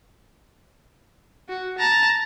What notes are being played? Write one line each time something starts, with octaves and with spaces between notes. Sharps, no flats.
F#4
A5 A#5